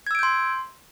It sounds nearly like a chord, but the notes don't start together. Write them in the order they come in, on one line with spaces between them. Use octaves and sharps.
G#6 E6 D7 G6 C6